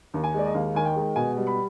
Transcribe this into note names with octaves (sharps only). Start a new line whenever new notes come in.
D#2
G#5
G#3 D5
D#5
D#2 F5
D#3 G#5
G5
G#3
B2 G#5
G3
B5